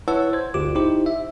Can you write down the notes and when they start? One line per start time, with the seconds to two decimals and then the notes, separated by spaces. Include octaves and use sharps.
0.08 E4 B4 C#5 F#5 A5 E6
0.33 C5 G#6
0.54 G1 D2 F4 G4 D6
0.75 D#4 E4 G4 C5
1.06 E5